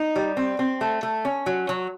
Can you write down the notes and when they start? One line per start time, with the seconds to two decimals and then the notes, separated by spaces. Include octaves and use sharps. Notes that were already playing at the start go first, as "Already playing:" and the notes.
Already playing: D#4
0.16 G3
0.37 C4
0.59 C4
0.81 A3
1.03 A3
1.25 C#4
1.46 F#3
1.69 F#3